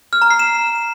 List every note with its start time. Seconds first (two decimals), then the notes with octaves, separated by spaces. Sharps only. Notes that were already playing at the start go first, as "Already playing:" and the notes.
0.13 F6
0.22 A#5
0.31 C7
0.39 E7